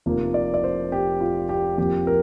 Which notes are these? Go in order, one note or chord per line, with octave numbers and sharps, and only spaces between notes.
F1 F2 F3 A#3
D5
D5
C5
G4
F4
G4
F2 F3 A#3 G4
A#4